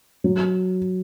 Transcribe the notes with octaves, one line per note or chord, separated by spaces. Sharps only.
F#3